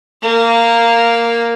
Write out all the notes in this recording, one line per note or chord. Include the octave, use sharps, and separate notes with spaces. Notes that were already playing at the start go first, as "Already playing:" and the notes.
A#3